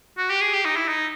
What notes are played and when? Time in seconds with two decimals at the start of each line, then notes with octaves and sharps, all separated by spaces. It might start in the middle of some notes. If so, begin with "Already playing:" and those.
0.17 F#4
0.30 G4
0.41 G#4
0.53 G4
0.65 D#4
0.76 E4
0.88 D#4